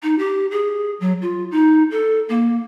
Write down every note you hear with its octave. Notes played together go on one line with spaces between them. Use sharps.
D#4
G4
G#4
F#3
F4
D#4
A4
A#3